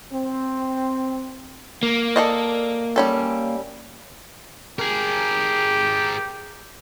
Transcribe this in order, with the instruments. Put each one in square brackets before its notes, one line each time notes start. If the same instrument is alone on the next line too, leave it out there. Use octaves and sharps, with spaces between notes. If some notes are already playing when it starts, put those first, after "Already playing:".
[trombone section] C4
[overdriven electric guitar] A#3
[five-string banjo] A4 D5 D#5
G3 C#4 A4
[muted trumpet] G4 [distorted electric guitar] G#4 A#4